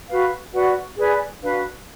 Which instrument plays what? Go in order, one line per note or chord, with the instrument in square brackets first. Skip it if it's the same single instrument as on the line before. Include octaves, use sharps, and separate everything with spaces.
[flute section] F#4 B4 F5
F#4 B4 D5 F#5
G#4 B4 D5 G#5
D4 F#4 B4 F5